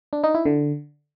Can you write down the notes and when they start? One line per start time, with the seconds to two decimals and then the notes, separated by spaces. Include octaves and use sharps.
0.13 D4
0.24 D#4
0.35 E4
0.46 D3